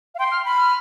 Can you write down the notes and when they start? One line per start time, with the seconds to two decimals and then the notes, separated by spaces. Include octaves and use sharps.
0.15 F5
0.19 G5 C6
0.31 F6
0.45 B5
0.57 F6